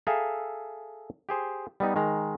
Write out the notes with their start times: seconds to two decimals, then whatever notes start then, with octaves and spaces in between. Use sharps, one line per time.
0.07 G#4 A4 E5 F5 G5 A#5
1.29 G4 G#4 C5
1.80 G3 B3 D#4
1.96 D#3 G#3 A#5